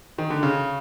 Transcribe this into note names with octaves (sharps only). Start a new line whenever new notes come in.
D#3
D3
C#3